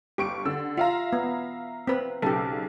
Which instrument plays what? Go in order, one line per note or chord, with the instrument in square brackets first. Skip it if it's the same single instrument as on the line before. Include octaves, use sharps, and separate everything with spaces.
[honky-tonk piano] G1 C#6 D7 [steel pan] G4
[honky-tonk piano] D3 E6
[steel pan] F4 [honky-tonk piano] E5 F5 A#5
[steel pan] B3
C4 B4
[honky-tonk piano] B1 C#3 [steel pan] G4 A4